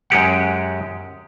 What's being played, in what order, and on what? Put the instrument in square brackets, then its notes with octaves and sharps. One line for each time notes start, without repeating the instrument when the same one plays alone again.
[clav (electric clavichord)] F#2 G#3 G4 F#5